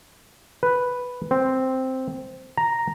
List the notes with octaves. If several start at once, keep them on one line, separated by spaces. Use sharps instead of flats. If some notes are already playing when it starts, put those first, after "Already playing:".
B4
C4
A#5